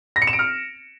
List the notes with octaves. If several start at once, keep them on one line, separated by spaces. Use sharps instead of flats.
A#6
C#7
E7
D7
F6